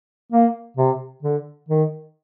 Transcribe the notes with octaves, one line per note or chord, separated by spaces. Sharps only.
A#3
C3
D3
D#3